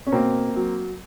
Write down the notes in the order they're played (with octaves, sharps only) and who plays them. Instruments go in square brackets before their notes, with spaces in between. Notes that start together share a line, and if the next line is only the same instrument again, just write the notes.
[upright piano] C#4
B2 A#3 C4
F#3